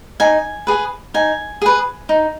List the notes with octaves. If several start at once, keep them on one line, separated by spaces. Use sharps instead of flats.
D#4 G#5
G#4 B4
D#4 G#5
G#4 B4
D#4